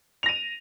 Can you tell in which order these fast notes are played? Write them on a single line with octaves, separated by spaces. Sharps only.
F7 A#6 D#7